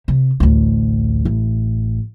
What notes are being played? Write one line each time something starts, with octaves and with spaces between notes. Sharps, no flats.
C3
A1 D2
A1